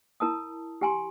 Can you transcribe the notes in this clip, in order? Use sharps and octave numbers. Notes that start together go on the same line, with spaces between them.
E4 A#4 A5 D#6
G4 G5 G#5 A#5 C6